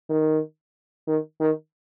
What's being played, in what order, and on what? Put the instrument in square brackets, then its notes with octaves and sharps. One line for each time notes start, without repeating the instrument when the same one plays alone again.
[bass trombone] D#3
D#3
D#3